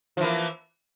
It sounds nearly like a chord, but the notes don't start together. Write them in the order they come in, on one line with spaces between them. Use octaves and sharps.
F3 E3 A#3